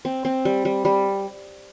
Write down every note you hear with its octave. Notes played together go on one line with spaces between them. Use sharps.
C4
C4
G3
G3
G3